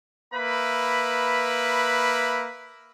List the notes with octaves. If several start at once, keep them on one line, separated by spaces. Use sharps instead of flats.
A#3 B4 E5 B5